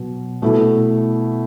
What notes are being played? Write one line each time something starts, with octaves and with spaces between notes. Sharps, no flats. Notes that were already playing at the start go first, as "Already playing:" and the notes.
Already playing: B2 F#3
B2 A3 E4 A4